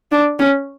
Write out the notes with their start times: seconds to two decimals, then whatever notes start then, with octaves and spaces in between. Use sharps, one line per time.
0.12 D4
0.39 C#4